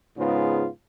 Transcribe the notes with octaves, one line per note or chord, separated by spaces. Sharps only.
G#2 C#3 B3 F4